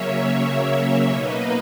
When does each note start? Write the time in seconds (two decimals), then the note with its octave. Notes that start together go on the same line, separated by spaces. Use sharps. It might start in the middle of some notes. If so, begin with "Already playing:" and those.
Already playing: C#3 F#3 A#3 C#4 C#5 E5
1.07 B2 A#3 D#4 B4 D#5